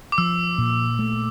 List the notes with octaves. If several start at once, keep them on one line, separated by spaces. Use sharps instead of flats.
D6
F3 E6
A#2
A3